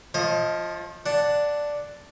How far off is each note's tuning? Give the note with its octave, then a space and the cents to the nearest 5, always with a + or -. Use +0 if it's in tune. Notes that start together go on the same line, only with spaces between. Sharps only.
F3 +0 C5 +45 D#5 +20
D4 +0 F#5 +0